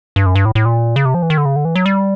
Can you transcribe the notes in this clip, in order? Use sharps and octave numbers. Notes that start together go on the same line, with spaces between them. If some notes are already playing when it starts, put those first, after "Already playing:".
G2
F#2
G2
A2
A2
A#2
C#3
C3
F3
E3
D#3
D3
C#3
D3
E3
F#3
G3